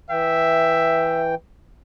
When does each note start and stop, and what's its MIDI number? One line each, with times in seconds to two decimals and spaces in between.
0.10 1.35 52
0.10 1.24 76
0.10 1.35 79